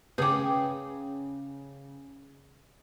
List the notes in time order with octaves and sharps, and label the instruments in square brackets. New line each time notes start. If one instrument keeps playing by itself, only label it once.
[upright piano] C#3 [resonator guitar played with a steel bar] G#4 G5 [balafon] B4 D6